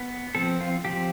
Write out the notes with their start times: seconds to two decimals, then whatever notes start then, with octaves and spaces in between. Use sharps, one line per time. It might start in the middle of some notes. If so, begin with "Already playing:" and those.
Already playing: B3
0.35 F3 C4 A4
0.61 F4
0.85 F3 C4 G4